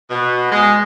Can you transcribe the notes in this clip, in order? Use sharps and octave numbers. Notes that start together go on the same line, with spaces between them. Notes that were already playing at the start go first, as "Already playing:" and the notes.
B2
G#3